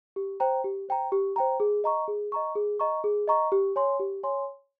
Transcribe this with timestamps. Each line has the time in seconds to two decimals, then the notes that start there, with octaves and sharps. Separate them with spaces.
0.16 G4
0.40 C5 G5 A#5
0.64 G4
0.89 C5 G5 A#5
1.12 G4
1.36 C5 G5 A#5
1.60 G#4
1.84 D#5 A#5 C#6
2.08 G#4
2.32 D#5 A#5 C#6
2.56 G#4
2.80 D#5 A#5 C#6
3.04 G#4
3.28 D#5 A#5 C#6
3.52 G4
3.76 C#5 G#5 C6
4.00 G4
4.23 C#5 G#5 C6